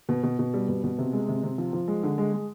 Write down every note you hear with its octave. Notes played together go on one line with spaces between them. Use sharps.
B2
B2
B2
G3
B2
B2
C3
G#3
C3
C3
F3
F3
G#3
D3
G#3
G#3